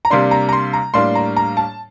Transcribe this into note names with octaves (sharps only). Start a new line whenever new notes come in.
A#5
C3 G3 A#3 D4 C6
A#5
A#5
C6
A#5
A2 G3 A#3 D4 C6
A#5
A#5
A5